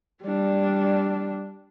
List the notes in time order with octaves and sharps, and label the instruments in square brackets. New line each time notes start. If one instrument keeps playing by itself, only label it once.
[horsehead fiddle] G3 D4